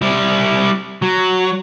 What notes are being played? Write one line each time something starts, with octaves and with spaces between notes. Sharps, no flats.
G3 E4
F#3